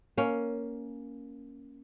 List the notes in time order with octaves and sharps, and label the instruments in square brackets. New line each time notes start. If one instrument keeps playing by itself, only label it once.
[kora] A#3 C#4